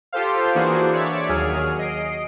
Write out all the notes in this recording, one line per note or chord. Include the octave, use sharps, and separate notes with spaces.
F4 G4 A4 C5 F5
E3 A#3 D4 F#4 G#4 C5
C#5 D5 E5
D#2 F#3 G#4 F6
D#5 C7 D7